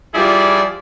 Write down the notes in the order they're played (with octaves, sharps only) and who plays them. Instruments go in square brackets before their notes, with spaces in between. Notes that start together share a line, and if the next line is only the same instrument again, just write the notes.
[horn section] F3 G3 E4 F4 G#4 D5